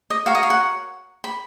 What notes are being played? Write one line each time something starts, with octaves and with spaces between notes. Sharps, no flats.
D#5
F#4 A#4 C#5 F5
D#5
F5
F#5
B5